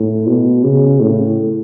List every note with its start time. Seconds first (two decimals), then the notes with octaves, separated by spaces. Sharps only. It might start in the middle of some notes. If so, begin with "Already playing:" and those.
Already playing: A2
0.27 B2
0.64 C#3
1.00 A2